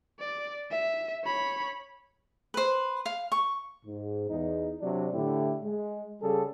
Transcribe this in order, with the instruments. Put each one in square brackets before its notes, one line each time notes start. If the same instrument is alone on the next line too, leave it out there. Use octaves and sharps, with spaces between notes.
[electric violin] D5
E5
C#5 B5
[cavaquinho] B4 C5
F5
C#6
[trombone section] G#2
E2 D#4
C3 F#3 D4
A2 D3 E4 G4
G#3
C#3 G3 G#4 A4